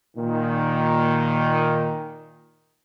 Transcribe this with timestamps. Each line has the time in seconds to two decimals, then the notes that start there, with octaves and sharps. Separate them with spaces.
0.17 A#2 D#3